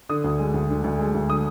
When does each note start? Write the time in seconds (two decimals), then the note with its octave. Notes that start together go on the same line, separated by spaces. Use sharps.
0.09 D3 D#6
0.24 D2
0.39 G#3
0.54 D2
0.69 D3
0.84 D2
0.99 G#3
1.14 D2
1.29 D3 D#6